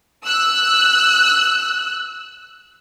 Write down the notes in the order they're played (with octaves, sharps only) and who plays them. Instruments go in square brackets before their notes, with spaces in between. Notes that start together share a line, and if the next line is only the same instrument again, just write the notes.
[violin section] E6 F#6